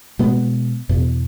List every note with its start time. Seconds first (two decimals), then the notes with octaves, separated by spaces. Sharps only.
0.19 B2 G#3 B3
0.89 E2 B2